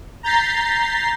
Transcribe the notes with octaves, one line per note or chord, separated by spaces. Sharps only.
A#5 G6 A6 B6 C7